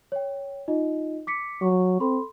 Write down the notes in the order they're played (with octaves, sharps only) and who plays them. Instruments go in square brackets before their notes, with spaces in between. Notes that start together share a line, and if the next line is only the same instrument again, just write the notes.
[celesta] C#5 G5
D#4 F4 D#5
D6 B6 C#7
[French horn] F#3 [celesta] C#6
[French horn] C4 [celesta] A4 B5 C6